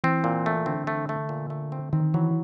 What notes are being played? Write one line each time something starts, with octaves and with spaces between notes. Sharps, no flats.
E3 C4
A#2
A3
D3 C4
A3
A3
A#2
A3
C4
D#3 C4
E3 F#3